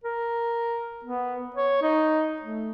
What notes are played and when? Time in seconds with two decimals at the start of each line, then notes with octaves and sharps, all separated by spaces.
0.04 A#4
1.04 B3
1.56 C#5
1.82 D#4
2.41 A3